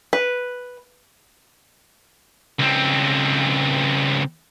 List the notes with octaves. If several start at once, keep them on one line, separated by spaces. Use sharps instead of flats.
B4
C#2 C4